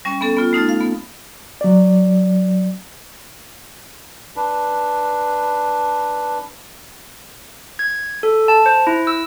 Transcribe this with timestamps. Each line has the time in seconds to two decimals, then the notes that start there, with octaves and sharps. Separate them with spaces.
0.05 G3 C#4
0.21 B3 C#4 A4
0.37 B3 F4
0.53 A3 D#4 F6 A6
0.69 F5
0.80 B3
1.61 F#3 D5
4.36 D4 B4
7.79 G#6
8.23 A4
8.48 A5
8.66 C5
8.87 E4
9.07 E6